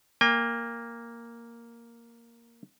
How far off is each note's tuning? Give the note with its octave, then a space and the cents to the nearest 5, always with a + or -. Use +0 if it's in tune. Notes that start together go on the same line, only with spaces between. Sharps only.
A#3 +0 G5 +45